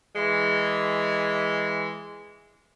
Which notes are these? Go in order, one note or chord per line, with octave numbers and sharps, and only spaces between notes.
E3 G#3